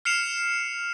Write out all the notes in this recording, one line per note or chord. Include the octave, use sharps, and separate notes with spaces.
F6 C7 C#7 E7 F7